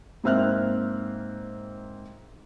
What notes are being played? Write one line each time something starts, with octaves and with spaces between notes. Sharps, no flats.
G#2 A#3 C4 E5 F6 F#6